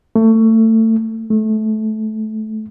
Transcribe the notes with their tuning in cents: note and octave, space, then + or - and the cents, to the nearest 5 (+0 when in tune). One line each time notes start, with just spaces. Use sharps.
A3 +25
A3 -20